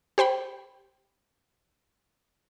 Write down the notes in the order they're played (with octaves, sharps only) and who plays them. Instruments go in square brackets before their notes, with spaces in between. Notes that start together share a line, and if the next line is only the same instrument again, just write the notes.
[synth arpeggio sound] G4 C5 G5 B5